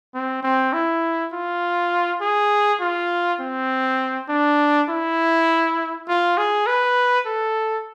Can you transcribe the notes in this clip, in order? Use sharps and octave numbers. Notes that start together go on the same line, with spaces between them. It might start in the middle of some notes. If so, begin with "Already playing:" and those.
C4
C4
E4
F4
G#4
F4
C4
D4
E4
F4
G#4
B4
A4